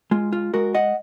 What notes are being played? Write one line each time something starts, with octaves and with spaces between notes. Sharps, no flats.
G#3 F4
F4
G#3 F#4 A#4
D#5 F#5